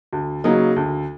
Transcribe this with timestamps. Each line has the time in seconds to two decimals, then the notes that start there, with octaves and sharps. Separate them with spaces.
0.13 D2
0.44 C#3 F#3 A#3 D#4
0.76 D2